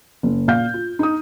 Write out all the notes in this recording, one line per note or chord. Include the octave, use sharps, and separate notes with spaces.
F#1
A#2 F5 G6
F4
D#4 D#6